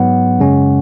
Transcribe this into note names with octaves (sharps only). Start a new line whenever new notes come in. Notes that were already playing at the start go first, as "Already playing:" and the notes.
Already playing: G#2 F#3 B3 F#5
F#2 C#3 G#3 C#4